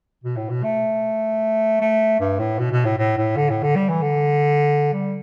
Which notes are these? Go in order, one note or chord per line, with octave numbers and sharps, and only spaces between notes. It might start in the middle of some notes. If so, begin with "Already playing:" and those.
B2
A2
B2
A3
A3
G2
A2
B2
B2
A2
A2
A2
D3
A2
D3
G3
E3
D3
G3